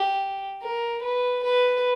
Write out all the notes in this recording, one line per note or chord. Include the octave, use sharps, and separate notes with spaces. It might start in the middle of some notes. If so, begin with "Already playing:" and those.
Already playing: G4
A#4
B4
B4